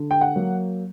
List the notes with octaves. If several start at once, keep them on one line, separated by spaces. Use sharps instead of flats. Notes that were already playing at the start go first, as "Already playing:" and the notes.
Already playing: D3
G5
F#5
F#3 A#3